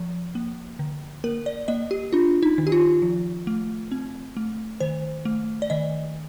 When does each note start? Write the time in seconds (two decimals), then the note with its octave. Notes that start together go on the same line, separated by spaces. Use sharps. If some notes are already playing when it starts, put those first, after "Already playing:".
Already playing: F3
0.35 A#3
0.79 D3
1.24 A#3 A#4
1.46 D5
1.68 A#3 D#5
1.91 G4
2.13 D4 F4
2.43 D#4
2.58 D#3
2.67 G4
2.72 F4
3.02 F3
3.47 A3
3.92 C4
4.37 A3
4.80 D#3 C5
5.25 A3
5.62 D5
5.70 D#3 D#5